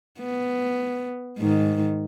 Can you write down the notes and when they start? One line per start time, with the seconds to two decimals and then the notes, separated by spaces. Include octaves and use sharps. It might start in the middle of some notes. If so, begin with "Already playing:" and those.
0.21 B3
1.39 G#2 D#3